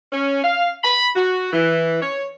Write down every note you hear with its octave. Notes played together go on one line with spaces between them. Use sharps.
C#4
F5
B5
F#4
E3
C#5